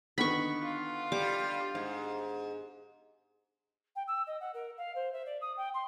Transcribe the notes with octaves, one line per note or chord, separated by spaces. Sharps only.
D3 D#3 B3 B5 C#6
F4
G3 D6
G#2
G5
E6
D#5
F#5
A#4
F5
C5
E5
D5
D#6
G5
C6